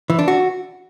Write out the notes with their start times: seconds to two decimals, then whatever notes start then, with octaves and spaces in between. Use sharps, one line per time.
0.10 E3
0.19 D4
0.28 F#4